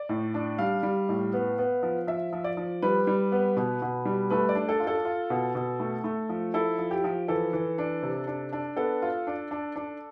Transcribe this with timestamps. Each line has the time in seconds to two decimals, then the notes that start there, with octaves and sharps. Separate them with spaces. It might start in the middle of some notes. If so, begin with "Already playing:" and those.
Already playing: D5
0.09 A2
0.34 D4
0.59 G3 F5
0.83 G3
1.09 A2
1.33 B3
1.58 B3
1.83 F3
2.07 F3 E5
2.33 F3
2.44 D5
2.57 F3
2.82 G3 B4
3.07 G3
3.32 B3
3.57 B2
3.82 B2
4.05 G3
4.30 A3 B4
4.49 D5
4.55 D4
4.69 A4
4.80 F4
4.87 A4
5.05 F4
5.30 B2
5.55 B2
5.80 A3
6.04 A3
6.29 F3
6.54 E4 A4
6.79 F3
6.91 G4
7.04 F3
7.28 E3 A4
7.53 E3
7.78 D4
8.02 C3
8.27 D4
8.53 D4
8.77 B3 A4
9.02 F4
9.27 D4
9.51 D4
9.76 D4